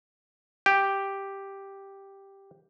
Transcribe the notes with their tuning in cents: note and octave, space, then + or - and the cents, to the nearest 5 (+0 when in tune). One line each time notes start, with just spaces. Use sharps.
G4 +0 G5 +0